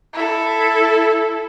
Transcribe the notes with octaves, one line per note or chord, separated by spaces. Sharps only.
E4 A4